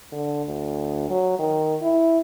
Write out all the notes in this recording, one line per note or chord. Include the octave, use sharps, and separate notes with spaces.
D3
D2
F#3
D#3
E4